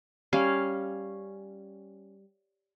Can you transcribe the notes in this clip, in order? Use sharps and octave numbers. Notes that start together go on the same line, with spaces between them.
G3 C#4 F5